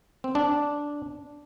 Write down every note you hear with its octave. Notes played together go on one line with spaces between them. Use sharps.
C4
D4